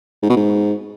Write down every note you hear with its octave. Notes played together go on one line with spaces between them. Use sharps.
G#2
B2
G#2